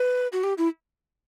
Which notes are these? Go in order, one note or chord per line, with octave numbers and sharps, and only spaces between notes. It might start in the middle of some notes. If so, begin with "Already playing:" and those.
Already playing: B4
F#4
G4
E4